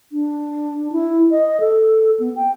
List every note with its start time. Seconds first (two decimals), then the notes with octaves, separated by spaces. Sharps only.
0.12 D4
0.92 E4
1.31 D#5
1.60 A4
2.20 B3
2.36 G5